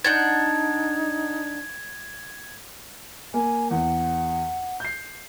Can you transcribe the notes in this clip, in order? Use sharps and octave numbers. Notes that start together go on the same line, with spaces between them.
D4 D#4 F#5 G6 G#6
A#3 G#5
E2 F#5
G6 C7